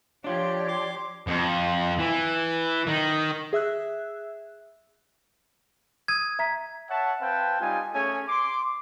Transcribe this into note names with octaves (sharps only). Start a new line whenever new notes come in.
F3 D4 F4 G4 C#5 D5
C6 D6
F2
E3
D#3
G#4 E5 E6 F#6
D#6 E6 G#6 D#7
E5 A#5 B6
C#5 E5 F#5 A5
C4 B4 F5 G5 A5
G3 D#4 F4 G#5
A3 C#4 G#4 C#5 G#5
C6 D6